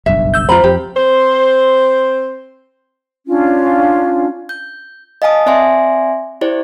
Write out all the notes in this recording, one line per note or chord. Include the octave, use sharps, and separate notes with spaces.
F#1 B1 G2 E5
E6 G6
F2 F4 C5 A#5 B5
F2 G4
C4 C5
C#4 D4 F4
G6
D#5 F5 G#5 A5 D#6
C4 D5 E5 G#5 C6 A#6
E4 G4 C5 D5